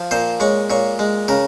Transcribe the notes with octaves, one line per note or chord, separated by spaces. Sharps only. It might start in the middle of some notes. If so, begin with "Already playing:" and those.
Already playing: F3
A#2 C5
G#3 C#5
A#2 C#5
G#3
C#3 A#4